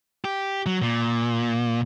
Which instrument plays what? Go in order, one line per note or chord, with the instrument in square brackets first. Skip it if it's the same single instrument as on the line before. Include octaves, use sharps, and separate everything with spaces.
[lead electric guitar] G4
F#3
A#2